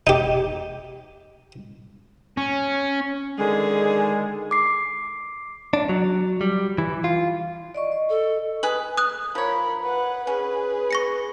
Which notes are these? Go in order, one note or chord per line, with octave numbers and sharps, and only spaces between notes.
D#4 G4
C#4
D3 D#3 G#3 G#4
D6 C7
D4
F#3
G3
E3
F4
D5 D#5 C#6
D#5
A4
G#4 B4 F#7
D#6 F#6
F3 A#4 C#5 B5
B4 F#5
C#4 G#4 B4
C#6 A#6 C#7